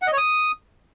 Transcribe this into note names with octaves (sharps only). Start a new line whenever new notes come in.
F#5
D#5
C#5
D#6